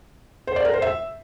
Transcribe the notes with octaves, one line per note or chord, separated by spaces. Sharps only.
C5
D5
A#4
C5
E5